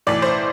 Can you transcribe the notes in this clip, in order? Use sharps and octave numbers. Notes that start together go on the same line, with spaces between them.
B1 A2 E3 D5
C5